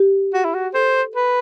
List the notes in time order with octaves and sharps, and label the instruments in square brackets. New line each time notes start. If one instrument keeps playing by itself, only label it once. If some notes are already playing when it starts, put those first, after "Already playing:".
Already playing: [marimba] G4
[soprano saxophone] F#4
E4
F#4
[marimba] A4 [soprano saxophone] C5
[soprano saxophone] B4